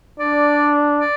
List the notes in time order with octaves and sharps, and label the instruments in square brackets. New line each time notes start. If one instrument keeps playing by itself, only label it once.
[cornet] D4 [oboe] D5
[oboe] D5